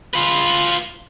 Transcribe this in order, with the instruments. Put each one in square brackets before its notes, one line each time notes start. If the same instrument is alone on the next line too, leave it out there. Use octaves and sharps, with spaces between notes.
[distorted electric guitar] F4 B4